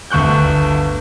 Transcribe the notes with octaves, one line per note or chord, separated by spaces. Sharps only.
G1 D2 C#6 F#6 G6